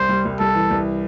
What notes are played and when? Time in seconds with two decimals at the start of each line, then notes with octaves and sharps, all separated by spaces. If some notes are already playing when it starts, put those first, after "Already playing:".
Already playing: C2 C5
0.09 G3
0.25 C2
0.40 C2 A4
0.55 E3
0.71 C2